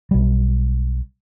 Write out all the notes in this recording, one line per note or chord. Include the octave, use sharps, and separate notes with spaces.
B1 G3